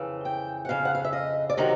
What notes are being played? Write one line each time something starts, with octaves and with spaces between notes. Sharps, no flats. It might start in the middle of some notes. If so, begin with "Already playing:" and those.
Already playing: F2 C#3 E3
G5
F#5
F2 C#3 F5
F#5
F5
E5
D#5
D5
C3 D#3 F#3 D#5